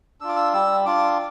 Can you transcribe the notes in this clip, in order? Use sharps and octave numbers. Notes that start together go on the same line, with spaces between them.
D4 F4 D6 E6
E6
G3 E6
D4 F4 D6